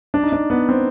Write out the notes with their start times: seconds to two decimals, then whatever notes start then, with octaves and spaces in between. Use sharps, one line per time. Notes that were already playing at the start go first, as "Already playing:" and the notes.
0.14 D4
0.23 D#4
0.32 D4
0.50 B3
0.69 C4